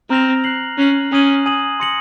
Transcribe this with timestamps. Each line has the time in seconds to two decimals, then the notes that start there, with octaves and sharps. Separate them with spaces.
0.10 C4 A#5 F6 A#6 F7
0.44 F#6 C7 F#7
0.78 C#4 F#6 C7 F#7
1.12 C#4 G#5 D#6 G#6 D#7 F#7
1.46 G#5 D#6 G#6 D#7 F#7
1.80 C6 D#6 A#6 C#7 F#7